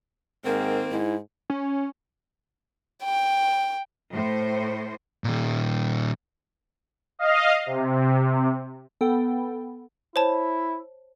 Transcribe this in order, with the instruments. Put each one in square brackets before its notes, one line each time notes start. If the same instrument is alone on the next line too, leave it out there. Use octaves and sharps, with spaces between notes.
[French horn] G#2 [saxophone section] D#3 A#3 C4 [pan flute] A#4
[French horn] G#2 [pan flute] E4
[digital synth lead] C#4
[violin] G5
[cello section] A2 C5
[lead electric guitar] A#2 D#3
[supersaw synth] D#5 F5
C3
[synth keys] B3 A4 G5
[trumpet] E4 [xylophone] C5 C#5 A5